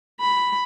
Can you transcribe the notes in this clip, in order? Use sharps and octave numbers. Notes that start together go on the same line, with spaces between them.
B5